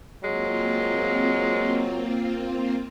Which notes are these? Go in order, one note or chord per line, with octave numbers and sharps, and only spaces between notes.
F#3 G#3 A#3 C4 F4